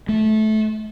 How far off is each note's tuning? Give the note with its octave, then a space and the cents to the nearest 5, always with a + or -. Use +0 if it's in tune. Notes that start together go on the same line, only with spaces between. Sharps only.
A3 -20